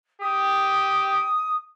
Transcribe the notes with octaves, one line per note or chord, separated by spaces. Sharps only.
G4 D#6